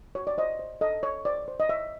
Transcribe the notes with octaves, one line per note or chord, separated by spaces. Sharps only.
F#4 C#5
D5
C5 D#5
C5
A4 D#5
C#5
C5 D5
C5
D#5
C#5 E5